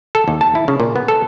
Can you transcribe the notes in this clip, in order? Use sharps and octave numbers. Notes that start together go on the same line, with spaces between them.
A4
D#2
A5
E4
C#3
A#2
B3
A4